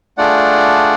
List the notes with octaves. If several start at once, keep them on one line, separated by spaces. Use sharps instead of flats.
A3 D4 F4 G#4 D5 F#5